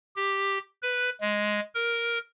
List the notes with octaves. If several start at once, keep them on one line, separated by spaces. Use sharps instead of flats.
G4
B4
G#3
A#4